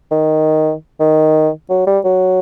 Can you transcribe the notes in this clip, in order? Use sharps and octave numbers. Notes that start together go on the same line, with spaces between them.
D#3
D#3
F#3
G3
F#3